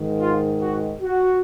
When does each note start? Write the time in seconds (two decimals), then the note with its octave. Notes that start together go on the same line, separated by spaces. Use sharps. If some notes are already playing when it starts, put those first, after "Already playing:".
Already playing: G#2 D#3
0.21 F4
0.61 F#4
1.02 F#4